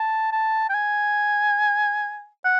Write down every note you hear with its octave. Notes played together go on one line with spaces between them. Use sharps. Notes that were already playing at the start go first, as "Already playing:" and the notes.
Already playing: A5
A5
G5
G#5
F#5